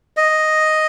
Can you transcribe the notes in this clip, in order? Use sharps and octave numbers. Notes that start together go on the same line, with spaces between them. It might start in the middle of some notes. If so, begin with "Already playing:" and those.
D#5